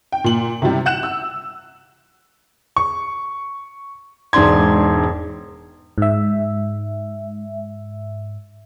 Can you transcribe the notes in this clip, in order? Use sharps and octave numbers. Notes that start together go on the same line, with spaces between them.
G5
A#2 F#7
C3 E3 G3
F#5 F#6 E7
E6
C#6
E1 G#2 D4 C6 G#6
G#2 E5